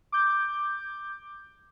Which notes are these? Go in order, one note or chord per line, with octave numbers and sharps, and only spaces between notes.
D6 G6